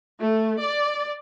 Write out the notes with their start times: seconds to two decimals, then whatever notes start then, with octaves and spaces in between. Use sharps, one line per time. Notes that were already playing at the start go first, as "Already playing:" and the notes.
0.18 A3
0.58 D5